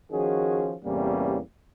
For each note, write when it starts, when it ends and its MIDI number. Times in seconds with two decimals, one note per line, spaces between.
0.12 0.75 51
0.12 0.75 53
0.12 0.75 61
0.12 0.75 66
0.12 0.75 68
0.84 1.40 33
0.84 1.40 40
0.84 1.40 48
0.84 1.40 55
0.84 1.40 58
0.84 1.40 61